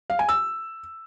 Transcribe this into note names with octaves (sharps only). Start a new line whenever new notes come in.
F5
G#5
E6